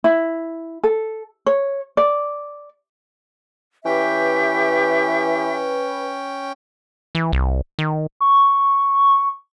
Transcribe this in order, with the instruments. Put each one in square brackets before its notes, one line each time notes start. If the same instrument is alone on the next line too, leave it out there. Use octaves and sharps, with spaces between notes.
[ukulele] E4
A4
C#5
D5
[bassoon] E3 [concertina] C#4 G5 [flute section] G4 E5 [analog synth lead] B4
[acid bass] E3
C2
D#3
[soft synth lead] C#6